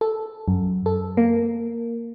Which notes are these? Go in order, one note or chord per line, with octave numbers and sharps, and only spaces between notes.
A4
F#2
A4
A#3